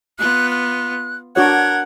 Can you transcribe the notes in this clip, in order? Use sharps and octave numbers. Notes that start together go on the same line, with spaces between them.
B3 F4 F#6
F#6
D4 F#4 A#4 C#5 F#5 G#6